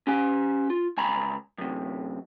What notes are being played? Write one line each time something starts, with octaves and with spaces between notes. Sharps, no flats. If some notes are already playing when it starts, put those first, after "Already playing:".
C#4 G4 G#5
F4
C#2 G#5 A#5 B5
F#2 C3